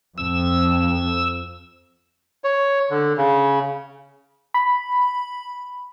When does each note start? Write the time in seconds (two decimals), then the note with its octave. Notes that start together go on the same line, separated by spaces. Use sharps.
0.18 F2 E6
2.44 C#5
2.90 D3
3.17 C#3
4.54 B5